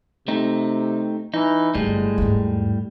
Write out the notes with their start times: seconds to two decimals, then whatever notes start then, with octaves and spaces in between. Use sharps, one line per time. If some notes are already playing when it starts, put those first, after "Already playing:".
0.28 C3 A3 C4 D#4
1.34 E3 D#4
1.75 G1 A2 G3 G#3
2.18 E2 G#2